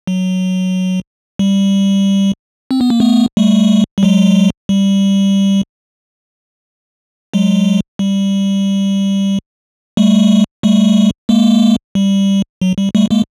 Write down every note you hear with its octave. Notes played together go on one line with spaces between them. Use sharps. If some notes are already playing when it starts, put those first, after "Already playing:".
F#3
G3
C4
B3
A#3
A3 B3
G3 A3
G3
F#3 G#3
G3
F#3 G#3
G3
G3 A3
G3 A3
G#3 A#3
G3
F#3
G3
G3 A3
G#3 A#3